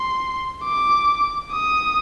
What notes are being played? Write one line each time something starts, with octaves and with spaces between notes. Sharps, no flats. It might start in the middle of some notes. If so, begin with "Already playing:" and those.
Already playing: C6
D6
D#6